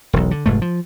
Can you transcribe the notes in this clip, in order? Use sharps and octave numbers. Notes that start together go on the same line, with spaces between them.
E1 B1
D3
F1 G#2 A3
F3